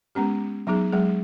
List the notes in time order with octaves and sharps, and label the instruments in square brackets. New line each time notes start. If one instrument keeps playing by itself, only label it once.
[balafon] G#3 B3 C#4 G4
F#3 B3 D#4 G#4
F#3 G#3 G#4